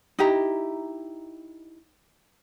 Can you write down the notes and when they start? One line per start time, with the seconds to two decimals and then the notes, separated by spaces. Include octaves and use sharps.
0.19 D#4 E4 G4 A#5